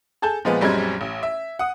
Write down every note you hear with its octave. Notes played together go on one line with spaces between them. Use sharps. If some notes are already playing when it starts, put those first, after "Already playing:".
G#4 A4 A5 G6
A#2 F3 G#3 B3
A#1 F#2 G3 G#3 C4 G#6
A1
E5
F#5 D#6